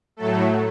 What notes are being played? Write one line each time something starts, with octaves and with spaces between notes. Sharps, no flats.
A2 F#3 A3 A4